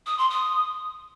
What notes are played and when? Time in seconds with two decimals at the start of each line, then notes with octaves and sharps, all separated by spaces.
0.06 D#6
0.18 C6
0.30 D#6